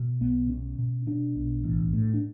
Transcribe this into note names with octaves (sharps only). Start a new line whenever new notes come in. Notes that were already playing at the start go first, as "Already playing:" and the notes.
Already playing: B2
B1 B3
B2 C#4
B2
B2 D4
B1
A1
A2
D4